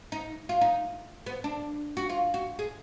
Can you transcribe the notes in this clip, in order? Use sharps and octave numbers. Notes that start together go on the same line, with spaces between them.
D#4
F4
D#4
B3
D4
F#4
F4
F#4
G#4